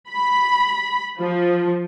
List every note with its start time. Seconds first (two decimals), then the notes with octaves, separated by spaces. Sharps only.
0.10 B5
1.19 F3